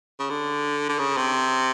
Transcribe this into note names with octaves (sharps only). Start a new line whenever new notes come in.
C#3
D3
D3
C#3
C3